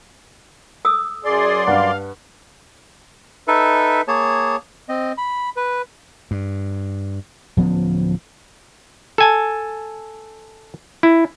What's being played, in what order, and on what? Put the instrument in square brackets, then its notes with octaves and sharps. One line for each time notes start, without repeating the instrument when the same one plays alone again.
[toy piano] A4 D#6 E6
[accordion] F#2 D5 C6 [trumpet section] G#4
[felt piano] G2 F#5 [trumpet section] F5
[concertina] D#4 A4 B4 E5
A#3 G#4 C#5 A5
C4 D#5
B5
B4
[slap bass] G2
D1 F3 B3 C#4
[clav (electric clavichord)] A4 G#5 A5
E4